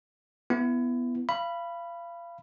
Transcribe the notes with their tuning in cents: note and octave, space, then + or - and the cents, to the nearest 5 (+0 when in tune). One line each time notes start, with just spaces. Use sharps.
B3 +0 E4 +25
F5 -30 B5 +0